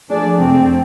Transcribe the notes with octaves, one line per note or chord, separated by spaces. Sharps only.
F3 A3 D4 G#4 D5
F2 C3 F3 A3 C4